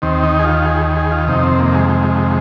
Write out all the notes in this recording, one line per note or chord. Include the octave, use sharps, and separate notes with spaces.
D#2 D#3 C4
D#4
G#4
F4
G#4
G#4
F4
F2 C3 D#3 D#4
C4
A#3
G#3
G#3